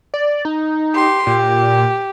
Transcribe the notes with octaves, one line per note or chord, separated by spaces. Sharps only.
D5
D#4
G4 C6
A#2 G4